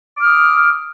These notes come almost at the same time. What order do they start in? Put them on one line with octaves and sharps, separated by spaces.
D6 F6 D#6